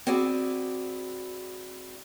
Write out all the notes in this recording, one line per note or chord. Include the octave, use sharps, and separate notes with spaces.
C4 E4 F#4 G#4 D5